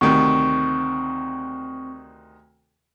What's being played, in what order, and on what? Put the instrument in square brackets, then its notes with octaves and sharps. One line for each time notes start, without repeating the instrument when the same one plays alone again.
[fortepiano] D2 C3 D#3 [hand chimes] C4 C#6